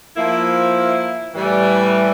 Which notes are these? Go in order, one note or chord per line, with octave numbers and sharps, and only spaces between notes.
F3 A#3 E4
A2 E3 G3